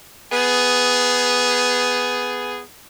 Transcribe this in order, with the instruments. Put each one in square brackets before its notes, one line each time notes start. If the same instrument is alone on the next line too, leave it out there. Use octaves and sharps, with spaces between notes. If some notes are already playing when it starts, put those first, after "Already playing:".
[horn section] B3 G#4